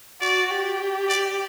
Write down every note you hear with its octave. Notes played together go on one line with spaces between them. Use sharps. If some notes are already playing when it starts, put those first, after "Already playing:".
F#4 D5
G4
D5